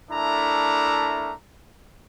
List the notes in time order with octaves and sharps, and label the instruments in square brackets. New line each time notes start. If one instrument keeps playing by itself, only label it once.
[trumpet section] A3 D4 E4 A#4 A#5